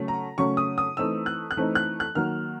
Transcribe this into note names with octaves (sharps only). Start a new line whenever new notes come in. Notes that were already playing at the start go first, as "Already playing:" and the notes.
Already playing: C#3 F#3 A3 C#4
A#5
C#3 F#3 A3 C#4 C#6
D#6
D#6
E3 A3 C4 D#4 E6
F#6
F#6
E3 A3 C4 D#4
F#6
F#6
D#3 F#3 A#3 F6